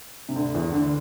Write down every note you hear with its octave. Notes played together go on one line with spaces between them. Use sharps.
C3
D2 D3
E2 E3
D2 D3